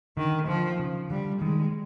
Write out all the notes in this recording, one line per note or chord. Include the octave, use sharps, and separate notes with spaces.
D3 D#3
D3 F3
C#3
D3 G3
D#3 G#3